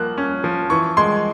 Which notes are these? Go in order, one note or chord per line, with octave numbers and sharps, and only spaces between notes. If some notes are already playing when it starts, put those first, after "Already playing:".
Already playing: F3 A#3 F#6
C#4
F3
E3 C#6
G#3 C6